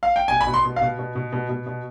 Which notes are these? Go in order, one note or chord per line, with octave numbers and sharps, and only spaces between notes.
F5
G5
B2 G#5
B5
B2
C6
B2
F5
B2
B2
B2
B2
B2
B2